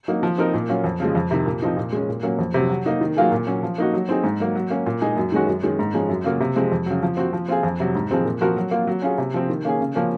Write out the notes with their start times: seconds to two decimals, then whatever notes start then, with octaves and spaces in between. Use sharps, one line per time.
0.08 F#3 A#3 D#4
0.23 F3
0.38 C4 D#4 A#4
0.54 A#2
0.69 F#3 C#4 F4
0.84 F2
1.00 C#3 F3 G#3
1.15 F2
1.31 C3 D#3
1.46 A#2
1.62 F3 C4 D#4
1.77 A#2
1.93 G#3 C#4
2.09 A#2
2.23 F#3 A#3 C#4
2.39 F2
2.54 C3 F#3
2.69 F#3
2.86 A#3 D#4
3.01 D#3
3.16 F#3 A#3 F4 G#4
3.32 A#2
3.47 F#3 C#4
3.63 F3
3.78 A#3 D#4 F#4
3.93 F#3
4.09 C4 D#4 G#4
4.24 G#2
4.40 F#3 A#3
4.55 F#3
4.70 A#3 C#4
4.86 A#2
5.02 G#3 D#4 G#4
5.17 F#2
5.32 D#3 G#3 C#4 F#4
5.47 F#2
5.63 D#3 G#3 C#4
5.79 G#2
5.94 F3 G#3 C#4
6.09 F#2
6.24 C#3 F#3 A#3 F4
6.40 C3
6.56 F3 G#3 C4
6.72 F2
6.86 C#3 F#3
7.03 F3
7.17 C4 F#4
7.33 F3
7.49 C4 F4 G#4
7.63 F2
7.80 C3 F#3
7.95 G#2
8.11 F3 G#3 C4
8.25 A#2
8.41 F3 C4 F#4 A#4
8.57 F#3
8.71 A#3 F4
8.87 F#3
9.02 C#4 F4 G#4
9.18 C3
9.34 F3 C4
9.50 D#3
9.65 A#3 C#4 G#4
9.81 C#3
9.95 F3 A#3 C#4